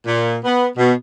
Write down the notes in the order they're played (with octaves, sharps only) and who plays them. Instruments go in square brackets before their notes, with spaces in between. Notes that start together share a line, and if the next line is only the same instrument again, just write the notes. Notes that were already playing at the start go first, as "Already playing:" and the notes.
[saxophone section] A#2
B3
B2